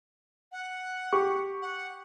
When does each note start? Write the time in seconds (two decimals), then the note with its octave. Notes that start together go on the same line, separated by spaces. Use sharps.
0.52 F#5
1.12 G4 C#6
1.62 F#5